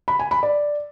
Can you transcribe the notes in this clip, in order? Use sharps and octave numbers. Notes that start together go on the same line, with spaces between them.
B5
G#5
B5
D5